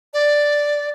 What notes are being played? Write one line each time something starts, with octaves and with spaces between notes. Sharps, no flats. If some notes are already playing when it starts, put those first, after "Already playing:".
D5